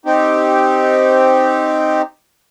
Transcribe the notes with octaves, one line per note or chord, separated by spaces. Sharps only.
C4 D#4 G4